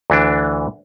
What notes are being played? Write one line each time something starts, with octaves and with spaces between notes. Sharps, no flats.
D2 E3 D4